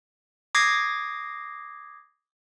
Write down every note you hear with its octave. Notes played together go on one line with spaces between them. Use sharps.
D6 D#6 G#6 A#6 C7